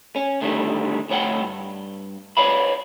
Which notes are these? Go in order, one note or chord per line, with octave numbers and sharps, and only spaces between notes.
C#4
A2 D3 D#3 G3
D2 A2 C#5 D5 F#5 G5
G2
B4 C#5 D5 F5 B5